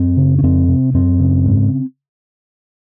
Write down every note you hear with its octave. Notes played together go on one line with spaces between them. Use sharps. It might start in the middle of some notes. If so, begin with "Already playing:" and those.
Already playing: F#2 C4
C#3
C#4
F2 C4
C3
F#2 C4
C#3
G#2